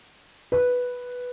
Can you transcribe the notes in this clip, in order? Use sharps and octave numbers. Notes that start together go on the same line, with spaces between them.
B4